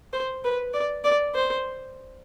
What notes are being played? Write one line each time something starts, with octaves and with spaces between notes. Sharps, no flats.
C5
B4
D5
D5
C5